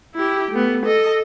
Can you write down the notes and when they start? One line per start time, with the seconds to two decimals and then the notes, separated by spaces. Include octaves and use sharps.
0.15 E4 G4
0.51 A3 B3
0.86 A4 D#5